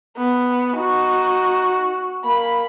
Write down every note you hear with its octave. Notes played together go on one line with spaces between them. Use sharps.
B3
D#4 F#4
A#3 B5